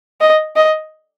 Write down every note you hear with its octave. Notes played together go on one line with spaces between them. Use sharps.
D#5
D#5